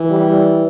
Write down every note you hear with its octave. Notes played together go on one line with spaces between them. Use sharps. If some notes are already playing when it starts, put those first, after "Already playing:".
Already playing: E3
G3